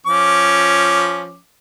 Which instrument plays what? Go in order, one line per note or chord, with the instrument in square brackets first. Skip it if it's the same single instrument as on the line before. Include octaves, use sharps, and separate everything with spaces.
[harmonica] F3 C#4 D6